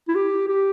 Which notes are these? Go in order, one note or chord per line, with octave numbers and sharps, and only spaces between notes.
E4
G4
G4